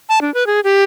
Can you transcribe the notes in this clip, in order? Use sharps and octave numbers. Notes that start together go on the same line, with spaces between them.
A5
D4
B4
G#4
G4